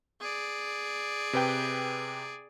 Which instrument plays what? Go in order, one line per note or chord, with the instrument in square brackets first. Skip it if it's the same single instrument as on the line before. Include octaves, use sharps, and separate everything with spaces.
[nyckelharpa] G#4 D5
[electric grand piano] C3 B4 G5